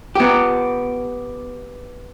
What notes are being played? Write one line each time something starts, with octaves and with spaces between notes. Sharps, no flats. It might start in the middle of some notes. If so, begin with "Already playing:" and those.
B3 G4